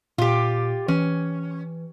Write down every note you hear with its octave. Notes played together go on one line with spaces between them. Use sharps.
A#2 F4 G4
E3 C#4